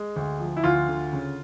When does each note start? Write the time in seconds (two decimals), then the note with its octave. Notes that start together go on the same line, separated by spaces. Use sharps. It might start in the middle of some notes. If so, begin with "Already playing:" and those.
Already playing: G#3
0.16 D2
0.40 F3
0.57 E4
0.64 D2 F4
0.88 D3
1.13 C#3